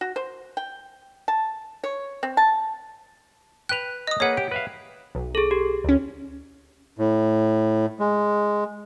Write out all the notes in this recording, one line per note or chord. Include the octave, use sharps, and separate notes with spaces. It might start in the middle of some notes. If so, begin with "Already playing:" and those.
F#4
C5
G5
A5
C#5
C4
A5
B4 G5 F#6 F7
D#5 D#6
A#3 G#4 B4 C#5 F#5
G4 D7
B4 E5 F5
B1
G#4 A4
G4
D2 C#4
A2
G#3